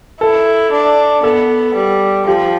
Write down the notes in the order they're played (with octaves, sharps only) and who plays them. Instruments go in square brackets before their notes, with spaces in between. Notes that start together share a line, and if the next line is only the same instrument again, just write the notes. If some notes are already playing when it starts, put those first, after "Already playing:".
[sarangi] E4 [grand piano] A4
[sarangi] D4
[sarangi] B3 [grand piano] A4
[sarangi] G3
[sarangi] F3 [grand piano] G4